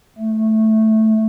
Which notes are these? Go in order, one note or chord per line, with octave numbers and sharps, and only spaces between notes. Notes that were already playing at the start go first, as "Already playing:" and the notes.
A3